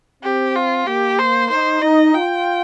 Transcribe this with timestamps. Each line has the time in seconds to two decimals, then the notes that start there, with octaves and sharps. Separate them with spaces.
0.23 C4 G4
0.55 F4
0.87 A#3 G4
1.18 C5
1.50 D#4 C5
1.82 D#4 D#5
2.14 F4 G5